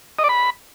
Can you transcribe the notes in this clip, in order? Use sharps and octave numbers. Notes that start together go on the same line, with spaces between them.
D#5
D5
B5